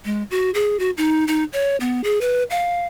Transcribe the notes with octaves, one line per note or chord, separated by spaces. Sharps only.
G#3
F#4
G#4
F#4
D#4
D#4
C#5
B3
G#4
B4
F5